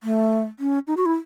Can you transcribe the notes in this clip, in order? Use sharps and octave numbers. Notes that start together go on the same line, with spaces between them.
A3
C#4
D#4
F#4
E4